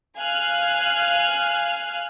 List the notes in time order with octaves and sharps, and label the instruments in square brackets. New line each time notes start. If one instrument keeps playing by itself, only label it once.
[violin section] F5 G#5 F6 F#6